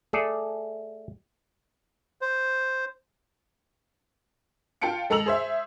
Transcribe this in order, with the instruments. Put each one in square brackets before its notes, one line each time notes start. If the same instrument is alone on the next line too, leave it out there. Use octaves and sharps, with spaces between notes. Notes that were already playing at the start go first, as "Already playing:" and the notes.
[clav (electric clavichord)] A3 G#4 A4 D5
[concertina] C5
[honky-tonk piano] F4 F5 G5 A5 C#7 D7
G#3 A4 A#5 E6 F7 F#7
G#4 C5 E5